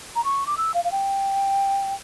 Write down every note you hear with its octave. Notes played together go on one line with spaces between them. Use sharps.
A#5
C#6
D6
E6
F5
F5
G5